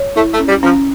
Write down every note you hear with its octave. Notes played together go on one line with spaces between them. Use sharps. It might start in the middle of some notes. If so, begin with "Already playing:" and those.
Already playing: C#5
A3 E4
A3
C#4
G3
F3 C#4